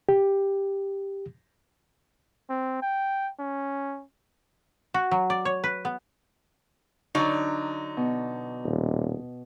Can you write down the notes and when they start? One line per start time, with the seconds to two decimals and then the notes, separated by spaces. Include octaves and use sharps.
0.09 G4
2.50 C4
2.82 G5
3.39 C#4
4.94 F#4
5.11 F#3
5.30 D5
5.45 C#5
5.64 B4
5.85 B3
7.15 D3 F#3 D#4
7.97 B2
8.65 D#1